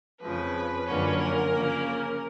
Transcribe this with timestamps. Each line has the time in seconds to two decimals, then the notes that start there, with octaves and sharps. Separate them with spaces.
0.19 F2 C#3 F3 B4
0.85 F#2 D3 F3 A#3 C#4
1.17 A#4
1.50 C#3 F3 A#3 C#4